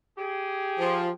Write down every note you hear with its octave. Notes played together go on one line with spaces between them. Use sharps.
G4 G#4
F3